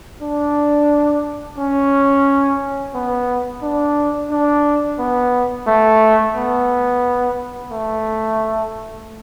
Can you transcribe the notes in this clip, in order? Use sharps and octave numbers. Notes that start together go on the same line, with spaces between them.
D4
C#4
B3
D4
D4
B3
A3
B3
A3